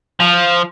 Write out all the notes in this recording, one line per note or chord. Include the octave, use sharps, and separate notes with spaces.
F3